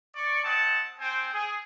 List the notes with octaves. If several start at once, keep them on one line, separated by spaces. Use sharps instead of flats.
D5 C#6
C4 D#5 F#5 A5
C4 C5 G5 G#5
G#4